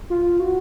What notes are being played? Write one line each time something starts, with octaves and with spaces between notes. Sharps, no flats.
F4
F#4